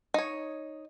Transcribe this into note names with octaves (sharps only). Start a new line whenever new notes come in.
D#4 C#5